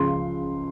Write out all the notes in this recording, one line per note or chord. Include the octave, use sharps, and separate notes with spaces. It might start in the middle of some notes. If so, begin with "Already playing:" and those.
Already playing: C#2 C#3 F3 C6